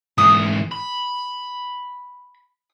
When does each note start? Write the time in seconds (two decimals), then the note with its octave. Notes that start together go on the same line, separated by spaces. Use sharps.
0.18 G#2 E3 D#6
0.72 B5